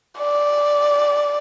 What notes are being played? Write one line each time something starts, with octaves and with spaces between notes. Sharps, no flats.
D5